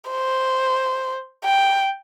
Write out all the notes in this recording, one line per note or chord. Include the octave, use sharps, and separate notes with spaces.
C5
G5